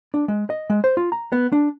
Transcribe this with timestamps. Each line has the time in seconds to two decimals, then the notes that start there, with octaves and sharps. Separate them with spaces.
0.14 D4
0.28 G#3
0.50 D#5
0.70 G#3
0.84 C5
0.97 F4
1.12 A#5
1.32 B3
1.52 D4